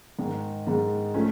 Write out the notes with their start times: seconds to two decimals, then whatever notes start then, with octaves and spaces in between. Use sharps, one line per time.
0.19 G#2 D#3 G#3
0.67 G#2 D#3 G#3
1.14 F3 A3 C#4